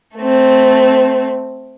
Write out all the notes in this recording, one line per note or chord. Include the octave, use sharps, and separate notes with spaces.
A3 C4